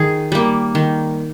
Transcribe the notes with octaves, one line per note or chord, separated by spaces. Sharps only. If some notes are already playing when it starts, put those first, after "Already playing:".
Already playing: D#3 G#4
G3 A#3
D#3